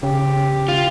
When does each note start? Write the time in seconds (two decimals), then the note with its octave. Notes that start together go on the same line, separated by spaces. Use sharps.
0.03 C#3 G4
0.68 F4